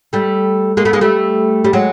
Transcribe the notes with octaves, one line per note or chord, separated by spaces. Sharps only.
G3 A3
G#3 A#3
A3 B3
G#3 A#3
G3 A3
G3
F#3 G#3